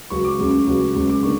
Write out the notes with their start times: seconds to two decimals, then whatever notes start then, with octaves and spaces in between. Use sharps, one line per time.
0.10 C#2 C#3 F#3 C#6
0.24 D6
0.38 C#2 C#3 F#3
0.67 C#2 C#3 F#3
0.95 C#2 C#3 F#3
1.10 D6
1.23 D3 A#3 C#6